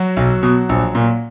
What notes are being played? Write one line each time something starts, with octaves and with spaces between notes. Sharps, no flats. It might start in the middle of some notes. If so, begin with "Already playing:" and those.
Already playing: F#3 F#4
B1
B2
A#1
A#2